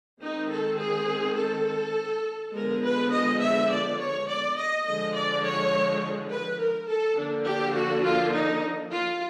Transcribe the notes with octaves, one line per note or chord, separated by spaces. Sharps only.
D#3 G#3 C4 D#4
A4
G#4
A4
D3 F3 G#3 B3 A#4
B4
D#5
E5
D5
C#5
D5
D#5
D3 F3 G#3 D#5
D5
C#5
B4
A#4
A4
D3 F3 A#3 D4
G4
F#4
F4
D#4
F4